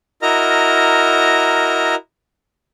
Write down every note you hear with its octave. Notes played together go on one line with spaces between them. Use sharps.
E4 F#4 A#4 D#5 A#5 F6